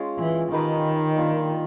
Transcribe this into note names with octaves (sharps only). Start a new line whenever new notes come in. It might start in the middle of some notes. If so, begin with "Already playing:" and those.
Already playing: G#3 C#4 F4
E3
D#3 D#4 G4 B4
G3 A#3 D4 F4